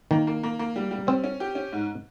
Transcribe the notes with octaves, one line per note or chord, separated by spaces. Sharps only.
D#3 A#3
A#3
A#3
A#3
G3
G3
C4 C#4
C#4
G4
C#4
G#2